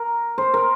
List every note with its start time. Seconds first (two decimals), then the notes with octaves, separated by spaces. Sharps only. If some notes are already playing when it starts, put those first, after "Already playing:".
Already playing: A#4
0.38 C5
0.54 A#4